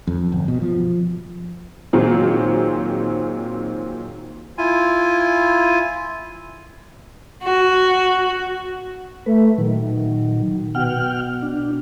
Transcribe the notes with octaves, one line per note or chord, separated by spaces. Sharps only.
F2
G1
B2
F3
A#2 D#3 F#3 C4 G#4
E4 F4 G#5
F#4
A3 B4
A#2 D#3 F#3
B2 F#5 G5 F6
D4